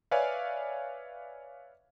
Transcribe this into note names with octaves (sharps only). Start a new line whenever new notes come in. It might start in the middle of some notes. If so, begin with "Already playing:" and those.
B4 C#5 D5 E5 F5 G#5